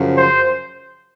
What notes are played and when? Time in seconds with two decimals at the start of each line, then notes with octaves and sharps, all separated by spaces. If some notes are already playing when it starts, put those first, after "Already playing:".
Already playing: F#2 C#3 F3
0.15 C5